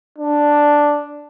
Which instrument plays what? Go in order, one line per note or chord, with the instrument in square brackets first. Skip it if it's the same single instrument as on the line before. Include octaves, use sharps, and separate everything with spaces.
[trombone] D4